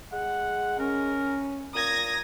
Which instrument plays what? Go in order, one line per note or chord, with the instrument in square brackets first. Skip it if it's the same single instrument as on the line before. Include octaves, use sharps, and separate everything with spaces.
[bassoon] G#3 [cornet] F#5
[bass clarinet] C#4 [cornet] A#4
[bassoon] A#2 [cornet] A#5 [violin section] D#6 G#6 A#6